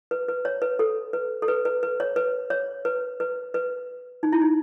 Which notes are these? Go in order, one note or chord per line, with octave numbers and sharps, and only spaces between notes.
B4
B4
C#5
B4
A4
B4
A4
B4
B4
B4
C#5
B4
C#5
B4
B4
B4
D#4
E4
D#4